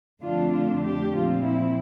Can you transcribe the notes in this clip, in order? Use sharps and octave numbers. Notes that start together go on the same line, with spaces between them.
F2 D3 A3 D4 F4
F4
G4
A#2 F3 C4 F4
E4